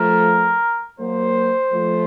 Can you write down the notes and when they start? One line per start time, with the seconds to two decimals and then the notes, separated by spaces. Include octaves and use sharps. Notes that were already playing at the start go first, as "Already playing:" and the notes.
Already playing: F3 A3 A#4
1.00 F#3 A#3 C5
1.73 F3 A3